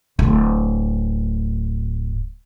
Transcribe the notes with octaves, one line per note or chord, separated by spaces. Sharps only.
D1 A2